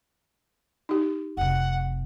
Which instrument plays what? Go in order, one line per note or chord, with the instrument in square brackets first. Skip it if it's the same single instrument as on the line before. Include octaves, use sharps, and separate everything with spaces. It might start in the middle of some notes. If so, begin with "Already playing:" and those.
[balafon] D#4 G4
[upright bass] F1 C3 [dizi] F#5